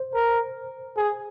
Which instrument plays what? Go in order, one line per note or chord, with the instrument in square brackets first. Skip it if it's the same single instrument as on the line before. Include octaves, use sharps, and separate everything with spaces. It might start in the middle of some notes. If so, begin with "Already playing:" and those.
Already playing: [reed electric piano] C5
[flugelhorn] A#4
G#4